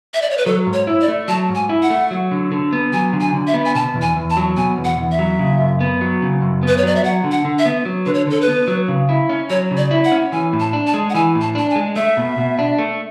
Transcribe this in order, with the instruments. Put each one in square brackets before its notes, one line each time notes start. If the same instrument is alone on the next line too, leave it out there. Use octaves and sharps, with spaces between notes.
[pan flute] E5
D5
C#5
B4
[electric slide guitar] F#3 [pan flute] A4
[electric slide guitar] G#2
[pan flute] C#5
[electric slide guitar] E4
[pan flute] D5
[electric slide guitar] A3
[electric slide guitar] F#3 [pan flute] A5
[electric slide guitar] G#2
[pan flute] G#5
[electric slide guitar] E4
[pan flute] F#5
[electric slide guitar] A3
F#3
D3
D3
B3
[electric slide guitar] F#3 [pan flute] G#5
[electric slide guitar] D3
[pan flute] G#5
[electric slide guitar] D3
[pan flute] E5
[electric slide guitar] B3
[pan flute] G#5
[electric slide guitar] B2 [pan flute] A5
[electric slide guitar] E2
[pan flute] G#5
[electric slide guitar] E2
[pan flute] A5
[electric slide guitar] F#3
[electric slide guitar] B2 [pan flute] G#5
[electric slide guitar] E2
[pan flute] F#5
[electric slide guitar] E2
[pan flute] E5
[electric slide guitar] F#3
C#3
F#2
B3
F#3
C#3
F#2
B3
[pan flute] B4
C#5
[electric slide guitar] F#3 [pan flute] D5
[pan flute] E5
[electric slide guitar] F#3 [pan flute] F#5
[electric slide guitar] D3
[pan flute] F#5
[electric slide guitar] D3
[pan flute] E5
[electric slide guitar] B3
F#3
[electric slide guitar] D3 [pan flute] B4
[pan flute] C#5
[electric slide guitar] D3 [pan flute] A4
[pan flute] B4
[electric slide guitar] B3
F#3
C#3
E4
C#4
[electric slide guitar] F#3 [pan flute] C#5
[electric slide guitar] C#3
[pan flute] D5
[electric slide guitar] E4
[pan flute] F#5
[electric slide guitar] C#4
[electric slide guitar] E3 [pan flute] G#5
[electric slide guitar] A2
[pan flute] A5
[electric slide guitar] D4
[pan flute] A5
[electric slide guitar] G#3
[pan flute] F#5
[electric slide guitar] E3 [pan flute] G#5
[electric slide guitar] A2
[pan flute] A5
[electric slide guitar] D4 [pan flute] A5
[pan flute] G#5
[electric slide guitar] G#3
[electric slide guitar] A3 [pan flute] E5
[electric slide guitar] B2
B2
D4
A3